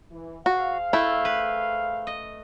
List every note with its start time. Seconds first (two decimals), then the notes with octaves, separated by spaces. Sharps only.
0.11 E3
0.46 F#4 G#4 C5 F5
0.93 A3 E4
1.25 B4
2.07 D#5